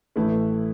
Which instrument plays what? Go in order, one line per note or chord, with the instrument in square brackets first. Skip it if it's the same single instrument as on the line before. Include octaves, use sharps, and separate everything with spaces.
[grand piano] A1 A2 A3 E4 B4